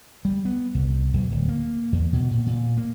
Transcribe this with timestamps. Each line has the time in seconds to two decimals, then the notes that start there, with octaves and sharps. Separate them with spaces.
0.25 G3
0.45 B3
0.75 C2
1.14 B1
1.31 D1
1.49 A#3
1.92 E2
2.13 B2
2.31 A#2
2.46 A#2
2.77 A#3